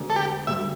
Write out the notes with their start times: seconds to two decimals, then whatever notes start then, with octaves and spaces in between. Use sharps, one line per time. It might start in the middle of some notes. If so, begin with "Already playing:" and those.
Already playing: E1 D2 D3
0.10 A4
0.16 G4
0.47 E1 D2 D3 G3 E5